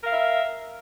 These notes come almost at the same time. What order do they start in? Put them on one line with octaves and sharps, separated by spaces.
A#4 F5 E5